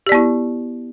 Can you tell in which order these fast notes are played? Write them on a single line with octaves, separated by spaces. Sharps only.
G4 D5 B3 E4